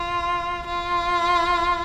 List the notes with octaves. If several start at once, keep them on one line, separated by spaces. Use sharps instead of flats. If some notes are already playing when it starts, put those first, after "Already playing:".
Already playing: F4
F4